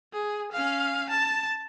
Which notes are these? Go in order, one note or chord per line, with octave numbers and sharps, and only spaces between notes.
G#4
C#4 F5
A5